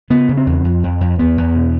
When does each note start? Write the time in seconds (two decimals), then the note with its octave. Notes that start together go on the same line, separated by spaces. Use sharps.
0.10 C#3 B3
0.29 C#3
0.37 C4
0.46 E2
0.64 F2
0.83 F2
1.01 F2
1.19 E2 B3
1.37 E2
1.56 B2